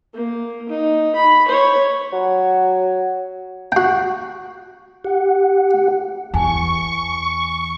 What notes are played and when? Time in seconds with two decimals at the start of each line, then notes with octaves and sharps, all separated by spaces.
0.14 A#3
0.69 D#4
1.15 B5
1.48 C#5
2.13 F#3
3.72 F#4 G5
5.05 G4 F#5
6.34 E2 G#5 A5 C#6